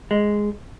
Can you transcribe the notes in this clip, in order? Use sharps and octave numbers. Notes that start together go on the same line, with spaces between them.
G#3